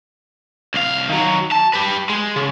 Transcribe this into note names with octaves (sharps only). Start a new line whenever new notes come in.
C2 F5
D#3 F#3
A5
G4 B4
G#3
C#3